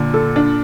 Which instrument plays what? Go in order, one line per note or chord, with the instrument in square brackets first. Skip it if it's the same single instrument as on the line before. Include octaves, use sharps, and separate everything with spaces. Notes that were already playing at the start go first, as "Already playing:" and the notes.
Already playing: [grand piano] A#2 [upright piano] D3
[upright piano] A4
D4